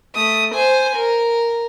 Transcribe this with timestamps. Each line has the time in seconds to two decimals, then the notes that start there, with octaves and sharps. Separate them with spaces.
0.15 A3 D#6
0.54 C5 G#5
0.95 A#4